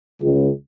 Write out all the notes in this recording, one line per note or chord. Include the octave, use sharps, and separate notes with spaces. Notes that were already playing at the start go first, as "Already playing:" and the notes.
C#2